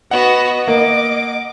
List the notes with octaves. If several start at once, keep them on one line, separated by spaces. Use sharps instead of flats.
B3 F#4 D#5 F#5
A#3 D6